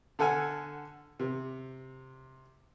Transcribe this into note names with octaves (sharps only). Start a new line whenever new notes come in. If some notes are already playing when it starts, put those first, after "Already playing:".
D3 A4 F#5 G#5 F6
C3